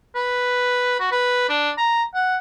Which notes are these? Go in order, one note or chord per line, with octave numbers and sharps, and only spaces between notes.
B4
F#4
B4
D4
A#5
F#5